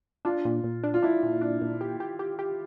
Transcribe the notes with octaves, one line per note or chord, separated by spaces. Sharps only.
D4 F4
A#2
A#2
D4
F4
D4 E4
A#2
D4
A#2
G4
G4
G4
G4